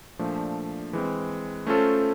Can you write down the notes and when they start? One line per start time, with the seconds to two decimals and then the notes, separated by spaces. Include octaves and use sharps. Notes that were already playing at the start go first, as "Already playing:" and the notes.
0.19 A#2 F3 A3 D4
0.93 E3 G#3 C4
1.67 A3 C#4 F4 A4 C5